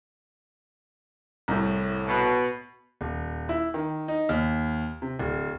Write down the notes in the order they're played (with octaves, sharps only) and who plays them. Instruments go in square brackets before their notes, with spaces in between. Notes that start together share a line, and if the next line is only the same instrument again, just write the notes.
[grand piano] C2 A2
[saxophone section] B2
[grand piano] D#1
E4
D#3
D#4
D#2
C3
D1